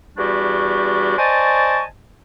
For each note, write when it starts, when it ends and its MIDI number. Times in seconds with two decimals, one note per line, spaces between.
0.17 1.16 40
0.17 1.16 55
0.17 1.16 62
0.17 1.16 66
0.17 1.16 67
0.17 1.16 85
1.18 1.84 72
1.18 1.84 74
1.18 1.84 75
1.18 1.84 80
1.18 1.84 81
1.18 1.84 85